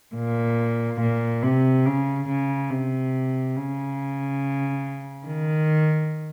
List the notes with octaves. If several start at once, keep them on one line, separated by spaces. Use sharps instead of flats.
A#2
A#2
C3
C#3
C#3
C3
C#3
D#3